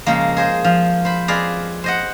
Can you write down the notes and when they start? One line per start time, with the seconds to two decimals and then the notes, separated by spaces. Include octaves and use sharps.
0.06 C#3 F3 G#3 A#3
0.37 G#4 C5 D#5
0.64 F3
1.05 C5 B5
1.28 C4 G#4 B4 D5 D#5 F5
1.84 C5 D#5 F#5